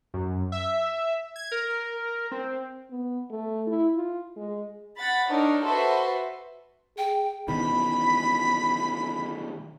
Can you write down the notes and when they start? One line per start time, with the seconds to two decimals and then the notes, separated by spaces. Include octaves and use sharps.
0.14 F#2
0.52 E5
1.36 G#6
1.52 A#4
2.32 C4
2.91 B3
3.30 A3
3.67 E4
3.96 F4
4.36 G#3
4.97 F#5 B5 A6
5.29 D4 D#4 A#4 C#5
5.63 F#4 A4 B4 C5 E5 C6
6.98 G#4 G5
7.48 B2 D#3 E3 B5